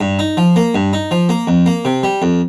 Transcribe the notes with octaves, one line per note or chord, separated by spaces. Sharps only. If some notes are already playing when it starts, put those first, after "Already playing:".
G2
D#4
F3
A#3
G2
D#4
F3
A#3
F2
A#3
C3
G3
F2